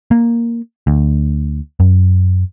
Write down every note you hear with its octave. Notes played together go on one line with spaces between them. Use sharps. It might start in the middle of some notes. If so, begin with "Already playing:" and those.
A#3
D2
F#2